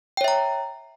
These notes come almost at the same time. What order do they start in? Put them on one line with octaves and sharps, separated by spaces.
G5 C#5 E5 A#5